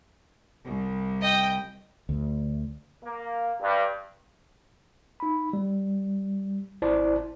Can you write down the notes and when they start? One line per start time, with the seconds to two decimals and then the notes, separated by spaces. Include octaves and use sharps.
0.63 C2
1.21 D#5 G5
2.09 D2
3.02 A#3
3.61 G2
5.20 D#4 B5
5.53 G3
6.82 G#1 E4 C5 D5 A5